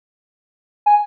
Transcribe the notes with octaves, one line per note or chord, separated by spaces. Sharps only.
G#5